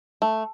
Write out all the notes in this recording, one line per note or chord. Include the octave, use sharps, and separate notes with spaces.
A3